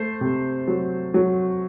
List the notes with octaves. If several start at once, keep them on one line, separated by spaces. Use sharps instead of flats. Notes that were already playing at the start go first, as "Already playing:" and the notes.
Already playing: A3 C5
C3
F#3
F#3